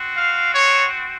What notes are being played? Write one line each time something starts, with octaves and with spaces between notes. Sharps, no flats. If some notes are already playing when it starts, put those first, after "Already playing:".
Already playing: C4 F#4
F5
C#5